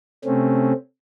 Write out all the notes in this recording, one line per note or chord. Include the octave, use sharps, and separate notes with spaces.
C3 A3 C4 C#4